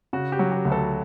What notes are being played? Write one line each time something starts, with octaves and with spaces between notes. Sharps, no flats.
C#3 F#4
G4
F#3
G4
D2
A4